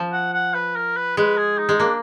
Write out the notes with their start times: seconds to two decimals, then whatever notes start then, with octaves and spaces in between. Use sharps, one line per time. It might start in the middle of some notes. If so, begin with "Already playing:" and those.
Already playing: F3
0.13 F#5
0.33 F#5
0.54 B4
0.76 A#4
0.97 B4
1.17 G#3 B4
1.37 G#4
1.58 D#4
1.69 G#3
1.80 A#3 D4